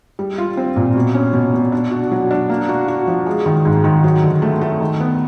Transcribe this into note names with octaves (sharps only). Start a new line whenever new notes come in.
G3
F4
C4
A#2
B2
C#4
B2
B2
D4
F#4
F#3
D4
A#3
F#4
F#4
F3
G#3
D#3
G#2
D#3
F#3
D3
A3
A3
D#3
B3